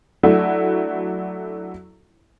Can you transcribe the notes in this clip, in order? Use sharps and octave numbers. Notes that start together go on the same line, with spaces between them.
F#3 A3 D4 E4 F#4